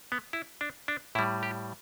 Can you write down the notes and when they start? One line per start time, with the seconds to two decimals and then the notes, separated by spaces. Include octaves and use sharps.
0.12 B3
0.33 E4
0.61 D4
0.88 D4
1.15 A2 E4
1.19 G3
1.43 G4